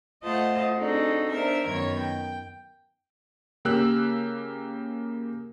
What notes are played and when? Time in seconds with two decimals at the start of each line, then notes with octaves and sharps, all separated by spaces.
0.24 A3 F4 C5 D#5 F#5 A5
0.76 C4 D4 D#4 F#4 G#4 A4
1.31 B3 D4 A#4 C5 E5
1.66 F#2 D#3 B3 C#5 G#6
1.97 G5
3.65 C#3 A#3 G4 E6 F#6